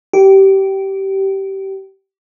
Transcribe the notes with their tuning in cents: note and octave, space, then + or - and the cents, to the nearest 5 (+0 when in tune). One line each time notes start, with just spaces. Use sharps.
G4 -20